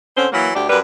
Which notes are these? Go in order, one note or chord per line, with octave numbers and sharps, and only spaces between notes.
D3 C4 C#4 C5
E3 F#3 A#3
D2 D4 G4
F#2 G3 B4